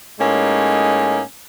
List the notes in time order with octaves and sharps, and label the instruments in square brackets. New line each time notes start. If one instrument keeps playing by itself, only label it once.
[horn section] A2 G#3 A#3 C#4 D#4